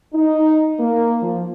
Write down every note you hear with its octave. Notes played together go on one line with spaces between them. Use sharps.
D#4
A#3
F3